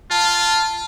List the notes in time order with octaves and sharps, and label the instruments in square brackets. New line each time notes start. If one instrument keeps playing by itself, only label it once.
[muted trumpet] F4 [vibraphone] A5